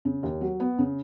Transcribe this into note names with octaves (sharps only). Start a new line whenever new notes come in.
C#3
D#2
F#3
B3
C#3